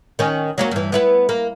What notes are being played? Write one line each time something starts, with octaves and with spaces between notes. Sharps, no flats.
D#3 C#4
F#3 A#3 C#4
G2 E3
B3 E4 B4
A#3